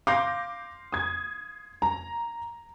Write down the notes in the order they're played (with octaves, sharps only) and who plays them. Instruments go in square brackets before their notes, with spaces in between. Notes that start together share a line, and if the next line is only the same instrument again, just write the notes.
[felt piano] F5 C6 [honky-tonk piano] D6 G6 A#6
[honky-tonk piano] D#6 G#6
A#5